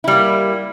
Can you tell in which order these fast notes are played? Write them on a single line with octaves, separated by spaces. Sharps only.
E4 G3 A#3